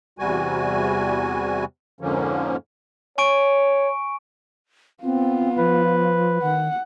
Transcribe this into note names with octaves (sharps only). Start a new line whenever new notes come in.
E2 C3 G3 F#4 G#5
F2 G#2 D3 F3 A#3 C#4
C#5 G#5 C#6 D7
B3 C4 F4
F3 B4
D#3 F#5